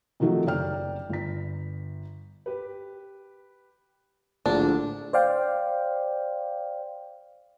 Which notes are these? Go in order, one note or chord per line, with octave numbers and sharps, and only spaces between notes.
C3 D#3 F3 F#3 A3 G4
F#1 D5 G5 F6
G1 B6
G4 B4
A#1 A2 D3 D4
C5 D5 F5 G5